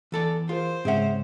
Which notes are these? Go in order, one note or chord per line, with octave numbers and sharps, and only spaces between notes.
E2 E3 A4 D5
F4 G#4 A#4 C5
G#2 C#3 G#3 C4 C#4 G#4 E5 F#5